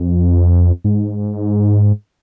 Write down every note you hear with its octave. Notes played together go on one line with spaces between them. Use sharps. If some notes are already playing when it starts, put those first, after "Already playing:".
Already playing: F2
G#2